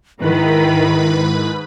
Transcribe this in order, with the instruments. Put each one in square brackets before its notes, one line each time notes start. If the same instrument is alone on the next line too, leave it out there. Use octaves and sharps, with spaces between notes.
[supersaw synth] G#2 B4 B5 [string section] D#3 [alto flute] E4